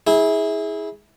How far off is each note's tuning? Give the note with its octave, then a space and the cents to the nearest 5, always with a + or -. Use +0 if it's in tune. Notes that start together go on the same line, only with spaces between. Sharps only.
E4 -25 G#4 +0